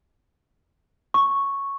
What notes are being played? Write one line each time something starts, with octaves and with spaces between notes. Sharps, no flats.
C#6